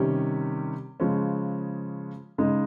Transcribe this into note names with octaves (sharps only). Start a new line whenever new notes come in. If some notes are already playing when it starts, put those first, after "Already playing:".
Already playing: C3 D#3 G3 C#4 G4
C#3 F3 G#3 C#4
C#3 G#3 D#4